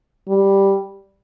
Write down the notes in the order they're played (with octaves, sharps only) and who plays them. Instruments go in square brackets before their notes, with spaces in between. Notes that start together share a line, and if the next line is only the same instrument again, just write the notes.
[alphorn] G3